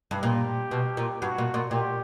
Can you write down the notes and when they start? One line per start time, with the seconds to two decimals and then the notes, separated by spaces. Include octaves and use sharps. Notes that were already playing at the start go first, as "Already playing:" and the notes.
0.11 G2
0.23 A#2 G4
0.71 B2
0.97 A#2
1.21 G2 F#4
1.38 A#2
1.54 A#2
1.71 A#2 G4